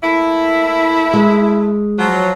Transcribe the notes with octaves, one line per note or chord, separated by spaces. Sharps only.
A3 A#3 E4
G#3
F3 F#3